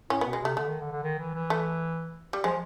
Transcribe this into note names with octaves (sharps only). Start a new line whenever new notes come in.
A2 C#4
B2 B3
G#3
C3 A3
D3 A3
D#3
D3
D3
D#3
E3
E3
A3
G3
F3 G#3